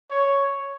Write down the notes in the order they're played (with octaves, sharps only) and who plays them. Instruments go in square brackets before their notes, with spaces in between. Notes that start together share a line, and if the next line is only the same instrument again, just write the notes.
[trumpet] C#5